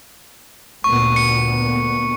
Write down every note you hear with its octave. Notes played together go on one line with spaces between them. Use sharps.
D2 A#2 B3 C#6
C#7